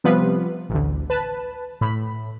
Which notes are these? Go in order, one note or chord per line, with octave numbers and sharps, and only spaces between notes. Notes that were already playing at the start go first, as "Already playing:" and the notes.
C3 F3 G3 B3 F4 B4
A1 D2
B4 A5
A2 B5